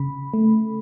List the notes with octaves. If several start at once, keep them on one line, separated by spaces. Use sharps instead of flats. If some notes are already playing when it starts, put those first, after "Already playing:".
Already playing: C#3 B5
A3